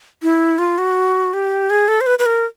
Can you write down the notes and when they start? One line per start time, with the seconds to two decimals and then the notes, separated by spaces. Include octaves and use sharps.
0.23 E4
0.58 F4
0.78 F#4
1.34 G4
1.70 G#4
1.88 A4
2.01 C5
2.06 B4
2.19 B4
2.26 A#4